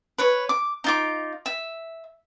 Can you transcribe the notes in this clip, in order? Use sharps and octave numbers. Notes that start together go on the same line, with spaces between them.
B4 C#5
D6
D#4 F4 D6
E5